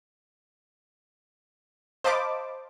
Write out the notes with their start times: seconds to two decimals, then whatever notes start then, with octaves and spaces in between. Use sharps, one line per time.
2.04 C5 D#5 F5 A5 B5 D6